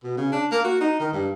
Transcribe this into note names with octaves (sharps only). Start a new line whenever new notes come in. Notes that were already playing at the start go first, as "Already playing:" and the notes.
B2
C#3
D4
A#3
F#4
D#4
D#3
G2